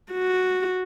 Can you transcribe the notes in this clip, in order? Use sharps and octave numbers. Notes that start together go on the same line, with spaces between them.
F#4